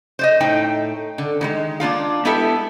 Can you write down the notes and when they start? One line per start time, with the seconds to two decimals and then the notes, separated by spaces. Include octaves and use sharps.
0.19 C5 D5 D#5
0.40 A2 D#4 G5
1.18 D3
1.41 A2 D#3 G#3
1.80 A#3 D4 F4 F5
2.25 G#3 B3 E4 G4 A4 E5